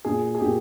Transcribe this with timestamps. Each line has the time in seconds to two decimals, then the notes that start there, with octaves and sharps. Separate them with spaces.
0.05 A#2 G#4
0.35 G#4
0.41 A#2 G4